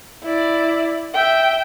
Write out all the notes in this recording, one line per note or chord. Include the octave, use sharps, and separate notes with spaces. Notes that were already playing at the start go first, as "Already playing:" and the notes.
E4 D5
E5 G5